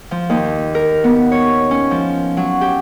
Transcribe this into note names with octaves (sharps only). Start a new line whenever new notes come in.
F3
D#2
A#4
B3
C#5
C#4
F3
F#3
G4